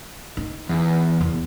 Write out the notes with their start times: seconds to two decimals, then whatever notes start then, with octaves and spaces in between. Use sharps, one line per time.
0.37 D#4
0.69 E2
1.21 E2